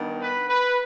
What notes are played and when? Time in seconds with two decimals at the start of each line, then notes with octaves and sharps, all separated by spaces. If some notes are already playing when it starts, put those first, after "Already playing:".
Already playing: G2 D#3 B3
0.19 B4
0.49 B4